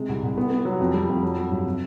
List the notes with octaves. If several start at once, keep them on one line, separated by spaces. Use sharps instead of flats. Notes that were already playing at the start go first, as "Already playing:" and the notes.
Already playing: C3 G#3
C2
C2
B3
B3
F#3
F2
G3
F2
F#3
F#3
G2
C3